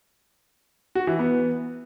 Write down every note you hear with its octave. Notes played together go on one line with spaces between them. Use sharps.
F#4
E3
B3